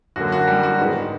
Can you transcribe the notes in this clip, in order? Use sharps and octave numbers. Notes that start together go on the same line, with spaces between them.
F#2 D3 F#3 A#3 F#4
F#4
G3 G4
F#4
G#2 D#3 G#3 B3